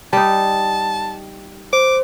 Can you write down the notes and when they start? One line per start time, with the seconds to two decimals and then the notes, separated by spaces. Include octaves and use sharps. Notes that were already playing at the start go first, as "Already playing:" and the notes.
0.13 G3 D#4 A5
1.73 C5 D6